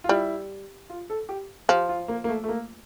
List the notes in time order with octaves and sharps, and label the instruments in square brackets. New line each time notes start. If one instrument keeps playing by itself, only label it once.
[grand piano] F4
[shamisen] G3 [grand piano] E4
[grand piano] F4
A4
G4
[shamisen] F3 [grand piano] G4
[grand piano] F4
A#3
A#3
A3
A3
A#3